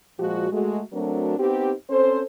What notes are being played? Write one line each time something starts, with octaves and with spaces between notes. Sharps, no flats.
A#2 F3 G#3 F#4
G#3 A3 F#4
F#3 A3 C4 D4 F#4 A#4
B3 C4 D#4 G4
C4 C#4 A4 C5